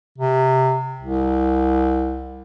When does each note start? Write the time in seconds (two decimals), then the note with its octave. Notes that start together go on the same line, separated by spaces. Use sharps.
0.18 C3
1.01 C2